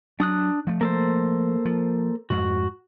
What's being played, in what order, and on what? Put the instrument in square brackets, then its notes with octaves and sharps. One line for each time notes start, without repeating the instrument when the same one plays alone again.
[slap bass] F#3 [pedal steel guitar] D4 D#6 F#6
[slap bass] F3 A3
[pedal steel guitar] A#3 A4 C5
[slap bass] F3
[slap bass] F2 G#2 [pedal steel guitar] F#4